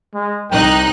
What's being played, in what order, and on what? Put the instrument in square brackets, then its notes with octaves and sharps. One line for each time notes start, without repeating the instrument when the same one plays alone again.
[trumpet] G#3
[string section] C2 D#4 F#6 [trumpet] G5